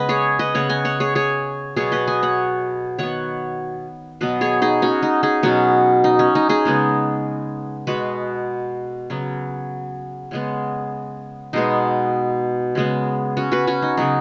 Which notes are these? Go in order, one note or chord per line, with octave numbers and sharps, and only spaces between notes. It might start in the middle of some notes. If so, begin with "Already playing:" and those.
Already playing: C#3 G#3 B3 B4 D#5
G#4 C#5
B4 D#5
C#3 B3 C#5 F#5
D#5 G#5
C#5 F#5
G#4 C#5
G#4 C#5
B2 F#3 B3 G#4 C#5
B4 D#5
D#5 G#5
C#5 F#5
D#3 B3 C#5 F#5
B2 F#3 B3 B4 D#5
G#4 C#5
D#4 G#4
C#4 F#4
D#4
D#4 G#4
B2 F#3 B3 C#4 F#4
D#4
C#4
D#4
D#4 G#4
C#3 G#3 B3
B2 G#3 B3 F#4 B4
C#3 F#3 B3
C#3 G#3 B3
B2 G#3 B3 D#4
C#3 G#3 B3
C#4 F#4
F#4 B4
C#4 F#4
D#4
C#3 F#3 B3 D#4